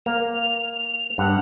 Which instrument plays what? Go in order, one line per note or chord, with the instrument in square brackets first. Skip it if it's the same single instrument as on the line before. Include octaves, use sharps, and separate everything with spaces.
[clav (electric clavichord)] A#3 [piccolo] F7
[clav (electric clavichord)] G2 [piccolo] F#5